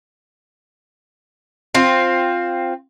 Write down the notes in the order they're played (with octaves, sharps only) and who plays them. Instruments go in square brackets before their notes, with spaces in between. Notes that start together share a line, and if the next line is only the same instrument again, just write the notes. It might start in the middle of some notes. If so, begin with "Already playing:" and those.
[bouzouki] C4 F4